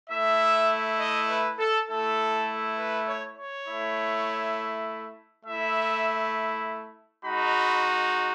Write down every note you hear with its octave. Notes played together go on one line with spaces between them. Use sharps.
A3 E4 E5
D#5
B4
A4
A3 E4 A4
B4
C#5
C#5
A3 E4
A3 E4 E5
G#3 D#4 F#4 B5